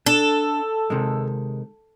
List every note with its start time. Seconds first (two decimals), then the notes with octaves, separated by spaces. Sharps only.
0.06 D4 A4
0.90 C3 D#3 G#3